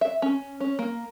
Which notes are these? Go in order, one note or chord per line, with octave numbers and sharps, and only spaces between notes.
E5
C#4
C#4
A#3